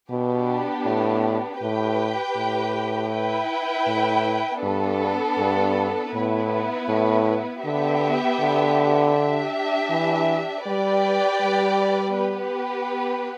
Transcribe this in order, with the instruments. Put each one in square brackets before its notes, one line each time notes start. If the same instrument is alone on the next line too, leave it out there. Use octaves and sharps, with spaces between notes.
[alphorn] B2 [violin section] B3 D4 G4
[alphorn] A2
[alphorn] A2 [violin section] G4 B4 G5
[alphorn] A2
[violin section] E4 B4 G5
[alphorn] A2
[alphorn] G2 [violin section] B3 D4 A4
[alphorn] G2
[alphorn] A2 [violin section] B3 E4 B4
[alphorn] A2
[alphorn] D3 [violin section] B3 G4 E5 G5
[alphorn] D3
[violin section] D4 G4 E5
[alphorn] E3
[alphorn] G3 [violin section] G4 B4 D5 G5
[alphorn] G3
[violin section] B3 G4 B4